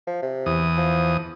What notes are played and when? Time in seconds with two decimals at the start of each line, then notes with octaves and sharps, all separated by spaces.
0.07 F3
0.22 C3
0.46 E2 D#6
0.77 F3